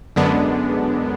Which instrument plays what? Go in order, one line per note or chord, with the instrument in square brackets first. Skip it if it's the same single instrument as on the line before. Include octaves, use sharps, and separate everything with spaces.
[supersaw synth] F#2 D3 G#3 B3 D4